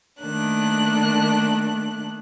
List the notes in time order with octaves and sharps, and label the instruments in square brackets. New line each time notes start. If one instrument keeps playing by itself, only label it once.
[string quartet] D#3 A3 A#3 D4 F#6